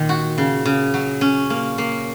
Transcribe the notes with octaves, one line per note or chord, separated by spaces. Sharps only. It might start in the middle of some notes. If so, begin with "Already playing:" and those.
Already playing: A#2 D#3
F#4
C#3
C#3
F#3
C#4
A#3
A#3